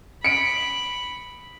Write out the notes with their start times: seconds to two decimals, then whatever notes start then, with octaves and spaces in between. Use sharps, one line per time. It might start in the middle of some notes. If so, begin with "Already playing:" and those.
0.24 B5 C#7 D7